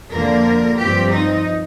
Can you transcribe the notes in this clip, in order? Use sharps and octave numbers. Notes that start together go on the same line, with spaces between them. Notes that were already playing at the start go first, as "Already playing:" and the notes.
F2 D3 F3 A#3 A#4
G2 F3 C4 G4
D#4